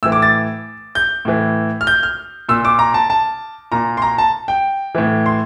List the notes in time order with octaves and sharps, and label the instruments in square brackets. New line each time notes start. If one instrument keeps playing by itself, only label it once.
[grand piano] A2 E6
E3
D6
A6
G6
A2 E3
F6
G6
F6
A#2 E6
D6
A#5
A5
A5
A#2 A#5
C6
A#5
A5
G5
A2 E3
C6